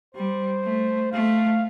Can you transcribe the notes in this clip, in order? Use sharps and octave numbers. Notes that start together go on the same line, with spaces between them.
G3 C5
A3
A3 F5